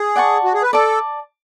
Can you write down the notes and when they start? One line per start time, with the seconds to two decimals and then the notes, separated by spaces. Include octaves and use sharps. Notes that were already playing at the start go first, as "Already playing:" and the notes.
Already playing: G#4
0.16 D5 F#5 A5 C#6
0.44 F#4
0.54 G#4
0.63 B4
0.73 A4 D5 A5 D6